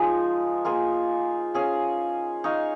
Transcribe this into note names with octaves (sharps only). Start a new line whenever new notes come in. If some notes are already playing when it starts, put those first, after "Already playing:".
Already playing: F3 G#3 D#4 G#4
A#3 F4 G#4
C#4 G#4 F5
D#4 C#5 F5